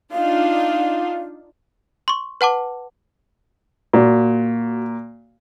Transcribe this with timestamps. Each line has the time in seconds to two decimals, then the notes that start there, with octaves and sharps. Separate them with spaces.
0.12 D4 D#4 F4 F5
2.08 C6 C#6
2.41 B4 F#5 A5 D6
3.93 A#2 F#4